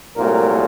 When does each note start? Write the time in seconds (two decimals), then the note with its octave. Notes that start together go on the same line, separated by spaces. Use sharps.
0.15 C2 A#2 F#3 A3 A#4